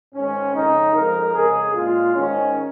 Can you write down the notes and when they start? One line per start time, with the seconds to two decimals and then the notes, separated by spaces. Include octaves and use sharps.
0.15 G#2 D#3 G#3 C#4
0.54 F2 C#3 G#3 D#4
0.94 F2 F3 G#3 A#4
1.34 F2 C#3 G#3 G#4
1.74 A#2 G#3 F4
2.14 G#2 D#3 G#3 C#4